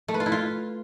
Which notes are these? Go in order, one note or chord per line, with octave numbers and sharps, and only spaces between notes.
A3
B4
F4
E4
F4